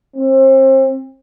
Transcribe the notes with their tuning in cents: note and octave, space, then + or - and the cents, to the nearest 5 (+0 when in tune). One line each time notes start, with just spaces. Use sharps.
C4 +35